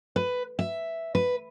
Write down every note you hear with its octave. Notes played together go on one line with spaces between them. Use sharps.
B4
E5
B4